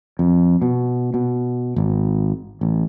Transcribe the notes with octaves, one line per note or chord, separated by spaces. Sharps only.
F2
B2
B2
G#1
A1